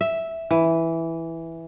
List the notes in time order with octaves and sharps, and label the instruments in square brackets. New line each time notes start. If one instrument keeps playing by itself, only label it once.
[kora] E5
E3